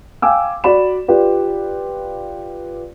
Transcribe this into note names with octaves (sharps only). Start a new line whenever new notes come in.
F5 G5 G#5 D6 E6
F#4 D5 B5 E7
F4 G4 B4 D5